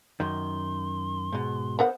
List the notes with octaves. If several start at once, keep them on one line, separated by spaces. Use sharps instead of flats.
F#2 D#3 C6
G#2 B2
B3 A#4 C5 F#5